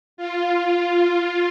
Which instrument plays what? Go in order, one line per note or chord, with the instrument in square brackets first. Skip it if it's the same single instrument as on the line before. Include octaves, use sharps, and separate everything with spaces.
[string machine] F4